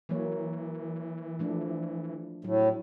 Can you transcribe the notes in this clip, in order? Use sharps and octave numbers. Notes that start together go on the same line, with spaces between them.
E3 F#3 A#3 C#5
F3 A3 D4
A2 F#3